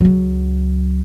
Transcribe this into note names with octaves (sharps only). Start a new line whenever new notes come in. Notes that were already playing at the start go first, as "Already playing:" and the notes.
C#2 F#3